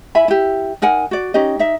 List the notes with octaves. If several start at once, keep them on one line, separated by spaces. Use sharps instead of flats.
E4 E5 G#5 B5
E4 G4
D#4 A#4 F#5 G#5
F#4 D5
C#4 D#4 G4 D#5
D#4 E5